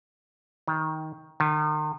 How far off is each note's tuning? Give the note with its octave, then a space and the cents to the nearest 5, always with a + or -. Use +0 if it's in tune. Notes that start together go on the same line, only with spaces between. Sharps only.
D#3 +15
D#3 -40